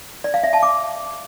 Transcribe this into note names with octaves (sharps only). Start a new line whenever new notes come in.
D5
F5
E5
A5
D6